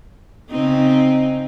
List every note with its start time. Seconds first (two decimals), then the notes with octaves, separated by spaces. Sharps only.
0.49 C#3 C4 D#4